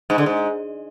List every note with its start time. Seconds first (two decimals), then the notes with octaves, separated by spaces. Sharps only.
0.10 G#2
0.18 D3
0.26 G#2